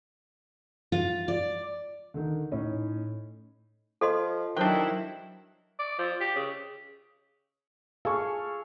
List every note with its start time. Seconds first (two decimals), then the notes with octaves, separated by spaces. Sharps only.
0.92 F4
1.28 D5
2.14 D3 D#3
2.51 A2 C#4 D#4
4.01 F3 A4 D#5 C6
4.57 D#3 F#3 D4 E4 C5 G5
5.79 D5
5.98 F3
6.21 G4
6.36 C#3
8.05 G#4 A4 F5 G#5 C#6